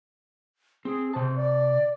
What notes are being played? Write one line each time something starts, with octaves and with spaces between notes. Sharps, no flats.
C4 G#4
C3 C4 A5
D5